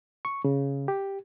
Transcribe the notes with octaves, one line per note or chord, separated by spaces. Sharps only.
C#6
C#3
G4